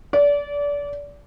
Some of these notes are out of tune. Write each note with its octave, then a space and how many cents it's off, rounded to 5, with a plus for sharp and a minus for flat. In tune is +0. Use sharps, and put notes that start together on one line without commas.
D5 -25